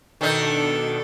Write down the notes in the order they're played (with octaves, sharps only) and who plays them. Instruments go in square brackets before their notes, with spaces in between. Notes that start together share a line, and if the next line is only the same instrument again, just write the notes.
[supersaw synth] B2 D4 [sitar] D#3 D#4 [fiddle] A4